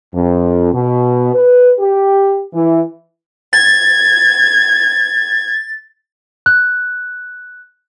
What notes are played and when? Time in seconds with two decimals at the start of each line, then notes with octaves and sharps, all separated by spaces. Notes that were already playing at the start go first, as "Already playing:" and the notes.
0.14 F2
0.74 B2
1.33 B4
1.79 G4
2.54 E3
3.53 G#6 A6
6.46 F#6